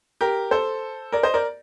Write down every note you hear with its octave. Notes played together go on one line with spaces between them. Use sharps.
G4 A#4
A4 C5
A#4 D5
C5 D#5
A#4 D5